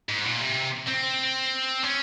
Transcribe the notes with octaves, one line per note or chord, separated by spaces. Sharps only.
G#2
A#2
C3
C4
C#4